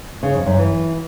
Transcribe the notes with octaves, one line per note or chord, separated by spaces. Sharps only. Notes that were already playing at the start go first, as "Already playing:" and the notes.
C#3
F2
F#2
E3